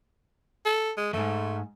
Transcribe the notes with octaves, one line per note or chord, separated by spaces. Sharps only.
A4
G#3
F2 G#2 A3